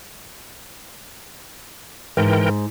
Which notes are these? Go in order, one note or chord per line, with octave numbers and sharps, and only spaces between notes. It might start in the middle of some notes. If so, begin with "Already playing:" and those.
G#2 E3 A#4 G5